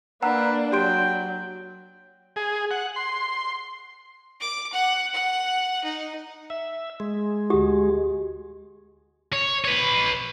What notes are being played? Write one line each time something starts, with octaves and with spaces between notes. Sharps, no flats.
A#3 D4 B4 F#5 A#5 E6
F#3 G4 G5 C6 D7
G#4
F#5
C6
D6
F#5
F#5
D#4
E5
G#3
D2 F#4 G4
C#5
B4 C#5